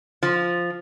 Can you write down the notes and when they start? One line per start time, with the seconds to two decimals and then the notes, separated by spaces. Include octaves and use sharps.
0.23 F3